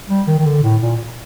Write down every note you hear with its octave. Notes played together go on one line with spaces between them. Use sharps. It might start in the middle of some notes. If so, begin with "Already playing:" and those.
G3
D#3
D#3
D3
A2
A#2